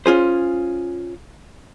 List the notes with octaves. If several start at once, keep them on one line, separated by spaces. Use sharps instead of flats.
C#4 F4 G#4 C5